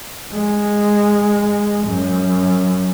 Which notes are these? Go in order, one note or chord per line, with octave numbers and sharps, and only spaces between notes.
G#3
F#2